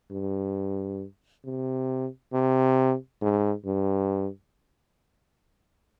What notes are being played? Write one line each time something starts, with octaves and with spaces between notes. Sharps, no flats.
G2
C3
C3
G#2
G2